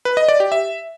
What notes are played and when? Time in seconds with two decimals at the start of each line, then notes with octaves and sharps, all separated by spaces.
0.05 B4
0.17 D#5
0.29 D5
0.40 G4
0.52 E5